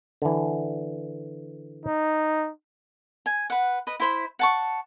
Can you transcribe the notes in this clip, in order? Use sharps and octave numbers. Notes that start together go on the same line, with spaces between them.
D3 E3
D#4
G#5
B4 F#5
B4 D#5
E4 C5 B5
F#5 A5 C#6